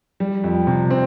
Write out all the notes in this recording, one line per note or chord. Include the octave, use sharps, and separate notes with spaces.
G3
F2
C3
C4